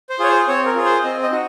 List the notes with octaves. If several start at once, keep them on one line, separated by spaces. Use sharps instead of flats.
C5
F4 G#4 C#5
C5
C4 C#5
A#4
F4 G#4
C5
C4 D#5
D#5
D#4 F#4